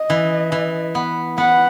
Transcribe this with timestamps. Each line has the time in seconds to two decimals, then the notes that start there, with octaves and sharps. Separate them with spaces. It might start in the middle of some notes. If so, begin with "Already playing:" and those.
Already playing: D#5
0.10 E3
0.52 E3
0.95 B3
1.38 B3 F#5